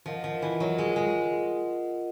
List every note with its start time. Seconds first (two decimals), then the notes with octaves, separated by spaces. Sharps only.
0.06 F3 F4 A#4 D#5 F#5
0.24 F3
0.42 E3
0.60 F#3 F4 A#4 D#5 F#5
0.78 G#3
0.96 G#3